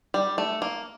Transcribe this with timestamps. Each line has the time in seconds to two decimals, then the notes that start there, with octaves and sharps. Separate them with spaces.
0.14 G3
0.38 A3
0.62 A#3